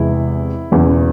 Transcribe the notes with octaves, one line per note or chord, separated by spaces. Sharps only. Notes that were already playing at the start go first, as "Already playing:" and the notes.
Already playing: E2 C3 E3 G#3 E4
E1 E2 C#3